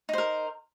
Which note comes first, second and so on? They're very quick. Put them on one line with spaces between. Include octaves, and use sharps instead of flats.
D#4 C5 A#4